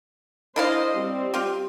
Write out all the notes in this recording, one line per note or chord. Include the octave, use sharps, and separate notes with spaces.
D4 E4 C5 D#5 F5
G3 C4
F4 G4